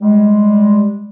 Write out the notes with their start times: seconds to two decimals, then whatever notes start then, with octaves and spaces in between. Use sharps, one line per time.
0.01 G3 G#3